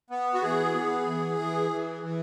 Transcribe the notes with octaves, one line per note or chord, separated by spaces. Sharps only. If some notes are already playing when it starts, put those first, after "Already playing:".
B3
F#4
E3 G#4
B3
E3
E3
E3
E3